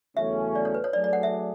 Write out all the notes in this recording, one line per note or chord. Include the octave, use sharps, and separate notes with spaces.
E2 C#3 F#3 A3 C#4 E5
D5
C#5
B4
C#5
F#3 A3 D4 G#4 D5
D5
F#5
E5